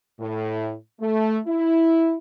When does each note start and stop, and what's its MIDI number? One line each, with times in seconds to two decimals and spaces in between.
0.20 0.73 45
1.01 1.39 57
1.47 2.16 64